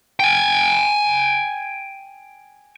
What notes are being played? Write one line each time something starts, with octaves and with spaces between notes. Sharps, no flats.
G5 G#5